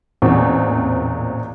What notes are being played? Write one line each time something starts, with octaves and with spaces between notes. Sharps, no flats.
A1 E2 A#2 C4